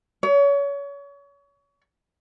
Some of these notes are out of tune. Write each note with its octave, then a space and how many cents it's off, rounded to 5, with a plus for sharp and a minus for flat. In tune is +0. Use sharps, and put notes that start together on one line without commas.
C#5 +30